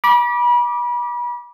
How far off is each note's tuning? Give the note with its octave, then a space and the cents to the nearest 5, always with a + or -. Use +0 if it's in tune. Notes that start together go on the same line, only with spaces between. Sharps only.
B5 -35 D6 +0